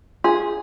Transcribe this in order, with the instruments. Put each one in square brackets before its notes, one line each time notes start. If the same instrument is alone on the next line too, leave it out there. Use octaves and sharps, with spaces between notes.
[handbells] F4 [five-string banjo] G#4